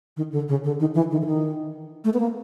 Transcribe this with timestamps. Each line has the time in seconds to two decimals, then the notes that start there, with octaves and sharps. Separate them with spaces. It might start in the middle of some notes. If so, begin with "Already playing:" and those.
0.17 D#3
0.32 D3
0.48 C#3
0.64 D3
0.80 D#3
0.95 E3
1.11 D#3
1.21 D3
1.26 D#3
2.04 A3
2.14 B3
2.20 A#3